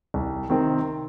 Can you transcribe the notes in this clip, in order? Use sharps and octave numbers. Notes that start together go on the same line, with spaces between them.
C2
C3 D#3 C4